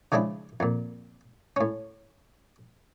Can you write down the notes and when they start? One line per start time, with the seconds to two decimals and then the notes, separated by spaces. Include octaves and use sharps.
0.12 C#3 F3 G#3 D4 E4
0.60 F2 A#2
1.56 A2 C#4